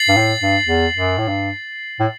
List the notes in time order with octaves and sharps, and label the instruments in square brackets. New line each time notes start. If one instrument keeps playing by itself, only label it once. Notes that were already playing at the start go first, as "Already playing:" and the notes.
Already playing: [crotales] A6 C7 F#7
[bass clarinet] G2
A2
G2
E2
F#2
A2
G2
A2